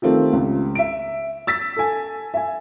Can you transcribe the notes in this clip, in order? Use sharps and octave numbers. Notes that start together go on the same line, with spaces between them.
D#3 A3 C4 F4 G4
C#2
E5 D7
E6 A6 B6
A4 G#5
E5 G#5